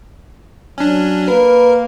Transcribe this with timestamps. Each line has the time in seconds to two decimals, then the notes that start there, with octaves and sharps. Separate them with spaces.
0.78 F#3 C#4 D4
1.28 A#3 A#4 B4